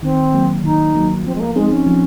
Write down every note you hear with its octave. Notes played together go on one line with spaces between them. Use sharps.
D#3 C4
F#3 A#3
D#3 D#4
F#3 A#3
F3 C4
G#3
A#3
G#3 C4 D#4 G#4 C5
C#4
F3